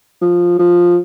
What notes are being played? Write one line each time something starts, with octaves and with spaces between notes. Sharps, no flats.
F3
F3